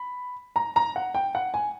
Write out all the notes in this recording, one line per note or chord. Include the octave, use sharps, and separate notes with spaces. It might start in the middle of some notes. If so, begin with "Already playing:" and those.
Already playing: B5
A#5
A#5
F#5
G5
F#5
G#5